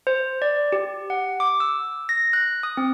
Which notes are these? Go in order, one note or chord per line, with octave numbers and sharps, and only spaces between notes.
C5
D5
G4
F#5
D6
E6
A#6
F#6
D#6
C4